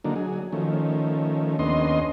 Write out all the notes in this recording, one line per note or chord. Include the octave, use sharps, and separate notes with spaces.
D3 F#3 A#3 D4 D#4
F#3 G#4
D#3 F3 A3 C#4
D#2 B3 C#4 D4 D#5 C6